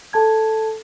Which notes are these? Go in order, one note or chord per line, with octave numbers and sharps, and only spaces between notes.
A4 A5 G#6